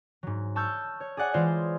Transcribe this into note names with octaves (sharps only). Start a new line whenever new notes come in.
G#2 F#3
A5 C#6 E6 F6 G6
C#5
G#4 D5 F#5 G#5
E3 G#3 F4 C5 D5